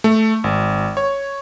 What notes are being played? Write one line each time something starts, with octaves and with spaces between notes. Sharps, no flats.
A3
G#1
C#5